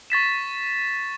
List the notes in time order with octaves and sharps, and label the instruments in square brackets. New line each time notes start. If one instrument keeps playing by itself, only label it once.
[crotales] C#6 A6 B6 E7